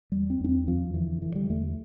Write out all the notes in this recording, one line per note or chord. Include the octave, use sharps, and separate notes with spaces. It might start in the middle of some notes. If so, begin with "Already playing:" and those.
E2 G3
C4
E2 D4
C4
F2 F3
D3 E3
D3 E3
G3
E2 A3